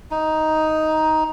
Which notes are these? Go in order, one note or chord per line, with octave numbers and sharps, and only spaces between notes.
D#4